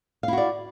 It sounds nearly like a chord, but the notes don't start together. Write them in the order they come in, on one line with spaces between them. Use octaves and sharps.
F5 E4 F#4 D5